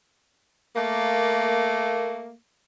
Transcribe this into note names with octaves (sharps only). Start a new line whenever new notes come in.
A3 A#3